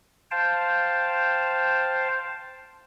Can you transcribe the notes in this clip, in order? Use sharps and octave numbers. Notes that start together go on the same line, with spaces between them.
C5 F5 G5 A5